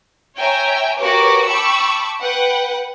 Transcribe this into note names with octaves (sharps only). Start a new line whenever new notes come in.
C#5 E5 G5 G#5 A#5
F#4 G4 A#4 B4 C#5 D6
G5 A5 B5 C#6 D6 E6
B4 F#5 G5